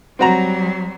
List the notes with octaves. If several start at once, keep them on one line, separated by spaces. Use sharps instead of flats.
F#3 G3 C4 F#4 A#5